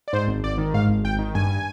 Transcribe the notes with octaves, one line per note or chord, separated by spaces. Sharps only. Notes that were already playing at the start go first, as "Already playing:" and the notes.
D5
G#2 C5
G#1
G#1 D5
D#3
G#2 F5
G#1
G#1 G5
D#3
G2 G#5